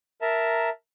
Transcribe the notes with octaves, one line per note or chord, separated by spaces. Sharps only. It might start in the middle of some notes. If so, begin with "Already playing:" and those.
A#4 E5 A5 A#5